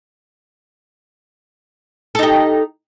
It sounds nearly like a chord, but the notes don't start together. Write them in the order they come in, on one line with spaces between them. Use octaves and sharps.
A4 D#4 G4